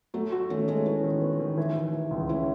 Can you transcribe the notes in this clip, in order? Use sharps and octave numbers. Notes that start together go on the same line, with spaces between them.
F#3 A3 F#4
F#4
D#3 A3 C#4
G#3 A3 C#4
B3 C#4 E4
D#3
B3
D#3
E3
E3
E3
C#2
E3 C#4 E4